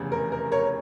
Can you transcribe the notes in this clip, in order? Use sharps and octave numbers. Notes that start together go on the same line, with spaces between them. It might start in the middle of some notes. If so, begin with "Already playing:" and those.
Already playing: F1 E2 C#3
A#4
A#4
A#4 C#5